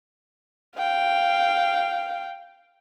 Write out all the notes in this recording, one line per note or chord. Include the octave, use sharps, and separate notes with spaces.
F5 G5